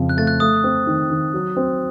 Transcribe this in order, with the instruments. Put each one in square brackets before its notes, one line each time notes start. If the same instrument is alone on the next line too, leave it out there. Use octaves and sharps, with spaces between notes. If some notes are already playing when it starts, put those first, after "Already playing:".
Already playing: [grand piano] F2 C#3 F3
[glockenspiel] F#6
[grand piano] A3 [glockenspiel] A6
[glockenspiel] F#6
[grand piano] A3 [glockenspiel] D#6
[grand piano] C4
D#3
D#3
F#3
C4